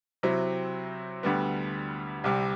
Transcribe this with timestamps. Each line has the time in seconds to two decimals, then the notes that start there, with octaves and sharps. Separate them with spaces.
0.23 C3 F#3 C4 E4
1.23 D2 D3 G3 B3
2.24 C2 C3 G3